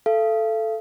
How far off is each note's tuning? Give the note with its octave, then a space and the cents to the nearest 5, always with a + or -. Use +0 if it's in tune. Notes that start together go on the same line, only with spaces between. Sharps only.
A4 +0 F5 -40